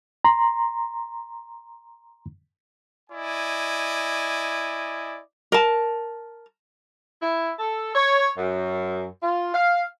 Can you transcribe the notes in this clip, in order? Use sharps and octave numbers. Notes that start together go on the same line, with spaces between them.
A#5 C6
E4 D5 D#5 G#5
A#4 A5
E4
A4
C#5
F#2
F4
F5